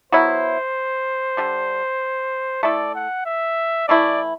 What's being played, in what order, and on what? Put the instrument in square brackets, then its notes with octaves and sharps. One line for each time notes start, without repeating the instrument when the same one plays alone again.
[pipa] F#3 B3 E4 [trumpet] C5
[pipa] D3 G3 D4
[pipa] A3 E4 A4 [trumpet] D5
[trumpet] F#5
E5
[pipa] E3 A3 E4 [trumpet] D5